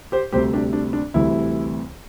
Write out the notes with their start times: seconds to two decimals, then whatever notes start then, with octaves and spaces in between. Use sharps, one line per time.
0.12 G4 C5
0.32 D2 C3 G3 G4 C5
0.53 D4 G4
0.73 D4
0.93 D4
1.14 D2 C3 E3 G3 E4